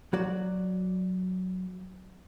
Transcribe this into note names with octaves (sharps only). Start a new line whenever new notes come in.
F#3 F#4 D5